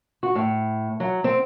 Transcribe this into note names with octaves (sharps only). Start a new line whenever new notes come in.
F#4
A2
F#3
C4